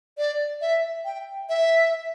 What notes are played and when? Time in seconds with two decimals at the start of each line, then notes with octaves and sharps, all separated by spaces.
0.18 D5
0.61 E5
1.05 G5
1.49 E5